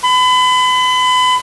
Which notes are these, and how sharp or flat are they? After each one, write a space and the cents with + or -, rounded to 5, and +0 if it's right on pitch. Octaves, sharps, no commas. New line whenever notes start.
B5 +35